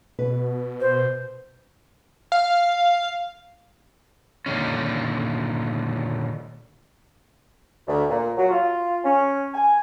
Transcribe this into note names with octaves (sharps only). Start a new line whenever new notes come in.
B2 B4
C5
F5
A#2 D3 D#3 C#4
D2
A#2
F#3
F4
C#4
G#5